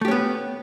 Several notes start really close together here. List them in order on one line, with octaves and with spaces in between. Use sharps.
A3 G4 C#4 B3